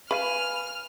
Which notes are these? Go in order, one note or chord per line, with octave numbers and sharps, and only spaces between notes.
B4 F5 G#5 B5 F6